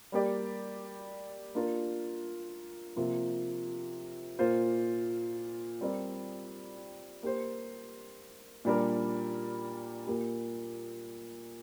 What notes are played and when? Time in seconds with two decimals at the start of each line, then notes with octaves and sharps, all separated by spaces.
0.12 G3 A#3 G4 D5
1.55 A#3 D4 F4 A#4
2.96 C3 F3 A#3 F4
4.39 A#2 A#3 F4 C5
5.81 G3 C4 A#4 D5
7.23 A#3 G4 C5
8.65 A#2 G3 D4 A#4
10.07 A#2 A#3 G4